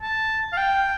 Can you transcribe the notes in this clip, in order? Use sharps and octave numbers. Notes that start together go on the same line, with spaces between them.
A5
F5
G5